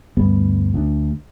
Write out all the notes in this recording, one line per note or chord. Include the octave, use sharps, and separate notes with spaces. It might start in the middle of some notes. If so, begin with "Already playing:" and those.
D2 G2 G3 B3
D2 D4